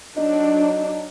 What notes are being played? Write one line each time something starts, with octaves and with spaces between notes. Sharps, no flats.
F#3 D4 D#4